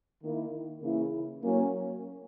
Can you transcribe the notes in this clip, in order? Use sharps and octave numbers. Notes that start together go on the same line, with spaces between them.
D#3 A#3 E4
C#3 E3 A#3 E4
F#3 A#3 C#4